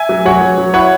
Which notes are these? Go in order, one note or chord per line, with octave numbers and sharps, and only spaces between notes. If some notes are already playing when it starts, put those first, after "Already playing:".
Already playing: E5 G#5
F#3
F#3 C#5 F#5
F#3
F#3
E4 C#5 F#5